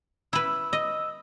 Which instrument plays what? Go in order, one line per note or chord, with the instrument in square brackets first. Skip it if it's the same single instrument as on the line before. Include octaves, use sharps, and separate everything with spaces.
[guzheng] E4 B4 [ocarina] E6
[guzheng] D#5